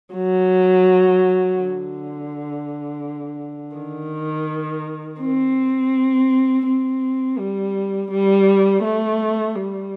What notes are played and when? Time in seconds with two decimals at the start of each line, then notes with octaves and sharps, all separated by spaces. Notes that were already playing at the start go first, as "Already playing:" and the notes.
0.15 F#3
1.60 D3
3.77 D#3
5.22 C4
6.66 C4
7.39 G3
8.12 G3
8.84 A3
9.56 G3